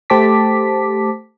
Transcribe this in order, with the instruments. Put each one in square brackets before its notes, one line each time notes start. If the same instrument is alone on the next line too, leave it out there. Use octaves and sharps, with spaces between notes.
[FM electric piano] A3 G4 C5 A5 D6 B6